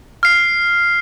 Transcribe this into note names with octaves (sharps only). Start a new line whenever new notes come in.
F6 C7